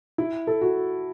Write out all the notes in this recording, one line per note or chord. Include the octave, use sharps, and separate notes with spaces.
E4
A4
F#4